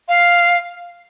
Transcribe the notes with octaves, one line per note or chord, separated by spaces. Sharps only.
F5